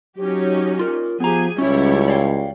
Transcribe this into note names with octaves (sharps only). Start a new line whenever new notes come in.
F#3 C#4 D#4 G4
F4 A#4
F3 B3 G4 G#4 G#5 A#5
C#2 G3 C#4 E4 C#5
D5 F5 G5